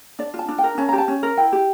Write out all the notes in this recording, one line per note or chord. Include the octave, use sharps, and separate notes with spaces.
D4 D5
F4
A5
D4
G5
A#4
C#4 A5
A#5
G4
A5
C#4
A#4
E4 G5
G4